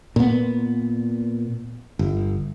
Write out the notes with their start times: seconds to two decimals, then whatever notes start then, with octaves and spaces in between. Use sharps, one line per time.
0.16 A#2 B3
1.99 G1